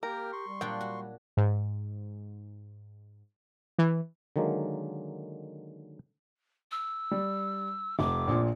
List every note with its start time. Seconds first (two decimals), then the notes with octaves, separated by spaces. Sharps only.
0.03 A#3 G4 A#4 G5 F6
0.32 C6 C#6
0.47 G3
0.61 A#2 F#3 D4 G5
0.81 F#4
1.37 G#2
3.79 E3
4.36 D3 D#3 F#3 G#3 A#3
6.71 E6
7.11 G3
7.99 F1 D6
8.28 A#1 A#2